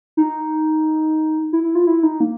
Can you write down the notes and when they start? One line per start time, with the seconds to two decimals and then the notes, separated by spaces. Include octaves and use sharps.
0.17 D#4
1.53 E4
1.64 E4
1.75 F4
1.87 E4
2.03 D#4
2.20 A#3